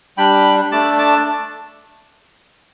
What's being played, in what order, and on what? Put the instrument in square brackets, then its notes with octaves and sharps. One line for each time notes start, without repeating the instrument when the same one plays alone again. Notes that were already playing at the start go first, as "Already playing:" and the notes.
[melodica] G3 D4 G5 B5
A3 D4 A5 D6
A5 D6